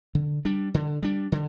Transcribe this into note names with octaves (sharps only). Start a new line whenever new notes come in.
D3
G3 D4
D3
G3 D4
D3